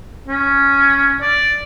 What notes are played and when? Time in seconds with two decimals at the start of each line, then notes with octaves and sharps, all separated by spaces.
0.28 C#4
1.21 D5